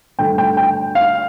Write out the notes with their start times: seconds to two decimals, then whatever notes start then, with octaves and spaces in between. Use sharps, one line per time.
0.19 G2 D3 A3 G5
0.38 G5
0.57 G5
0.95 F5